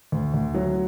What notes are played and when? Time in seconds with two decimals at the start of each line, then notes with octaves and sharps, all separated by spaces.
0.12 D2
0.34 D2
0.54 F#3